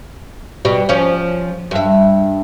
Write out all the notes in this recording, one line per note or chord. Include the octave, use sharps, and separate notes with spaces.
B2 G3
F3 C#4
G2 E5